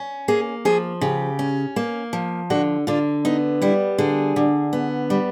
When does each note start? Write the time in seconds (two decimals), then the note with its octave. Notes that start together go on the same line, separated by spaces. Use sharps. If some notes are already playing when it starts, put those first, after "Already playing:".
Already playing: C#4
0.28 A#3 G#4
0.65 F3 G#4
1.01 C#3 G4
1.39 C#4
1.76 A#3
2.13 F3
2.50 D3 F#4
2.87 D3 F4
3.25 B3 D#4
3.62 G3 E4
3.98 D3 G#4
4.36 D3
4.73 B3
5.10 G3